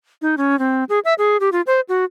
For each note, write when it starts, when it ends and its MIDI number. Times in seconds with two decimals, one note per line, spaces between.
0.22 0.35 63
0.38 0.58 61
0.59 0.84 60
0.89 0.99 68
1.05 1.14 76
1.18 1.37 68
1.40 1.49 67
1.52 1.61 65
1.67 1.80 72
1.89 2.05 66